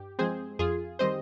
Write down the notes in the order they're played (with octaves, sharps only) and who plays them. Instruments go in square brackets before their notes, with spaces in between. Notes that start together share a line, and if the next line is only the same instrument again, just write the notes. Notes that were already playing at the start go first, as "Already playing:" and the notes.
Already playing: [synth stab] G2 G4
F3 G#3 C4 G#4 C5
F2 F4 G#4
D#3 G3 C4 C5 D#5